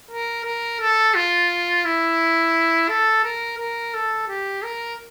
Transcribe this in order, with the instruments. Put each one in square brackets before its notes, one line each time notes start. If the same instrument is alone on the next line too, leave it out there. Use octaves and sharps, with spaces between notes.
[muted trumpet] A#4
A#4
A4
F4
E4
A4
A#4
A#4
A4
G4
A#4